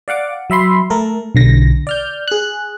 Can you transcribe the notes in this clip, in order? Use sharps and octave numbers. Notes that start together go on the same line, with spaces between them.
D5 F5 F#5 D6
F#3 E5 B5 C6
A3 A4 A#4
B1 D3 A#6
D5 F6 G6
G#4 F#6